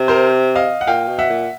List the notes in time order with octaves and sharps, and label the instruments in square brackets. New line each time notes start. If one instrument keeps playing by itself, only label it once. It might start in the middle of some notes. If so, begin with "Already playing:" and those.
Already playing: [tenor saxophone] C3
[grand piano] A#4 C5
D#5 F5
F#5
[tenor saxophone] A#2 [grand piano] F5 G5
[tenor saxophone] B2
[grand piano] E5 F#5
[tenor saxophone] A#2